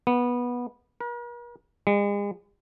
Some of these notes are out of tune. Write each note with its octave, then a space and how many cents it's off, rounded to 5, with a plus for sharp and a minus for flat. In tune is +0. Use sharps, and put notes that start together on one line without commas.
B3 -15
A#4 +45
G#3 -40